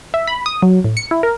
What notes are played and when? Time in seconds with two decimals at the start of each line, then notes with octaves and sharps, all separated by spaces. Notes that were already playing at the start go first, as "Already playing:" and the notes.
0.14 E5
0.27 B5
0.46 D#6
0.62 F#3
0.84 A2
0.97 C#7
1.11 E4
1.23 A#4